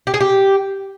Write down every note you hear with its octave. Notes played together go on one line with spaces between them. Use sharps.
G4
G#4
G4